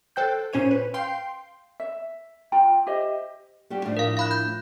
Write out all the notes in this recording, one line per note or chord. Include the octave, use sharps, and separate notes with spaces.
A4 C5 G5 F#6 G6
A#2 C#4 C5 C#5 D#7
B4
F5 G5 C6 G6 C7
E5
F4 G5 A#5
G4 C5 D#5 E5
G3 F#4 G4
A2 F3 D4
A#4 F5
F5 B5 F#6
G6